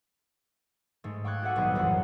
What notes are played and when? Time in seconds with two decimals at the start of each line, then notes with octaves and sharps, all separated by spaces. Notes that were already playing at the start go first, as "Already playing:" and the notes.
1.04 G#2 G#3 A3
1.24 F5 G5 C#6 D6 F#6 G#6
1.42 F#4 A4 C5 E5 F#5 G#5
1.56 D#1 B1 G3 B3 G#4 C5
1.75 C#2 F#2 A2 E3 F#5 C6